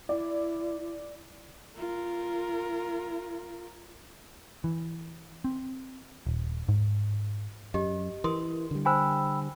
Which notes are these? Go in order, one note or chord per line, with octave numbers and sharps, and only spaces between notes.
E4 D5
F4 A#4
E3
C4
D#1
G#2
F#2 G4 D#5
E3 A#4 C6 D#6
D3 G3
C5 G5 G#5 B5 E6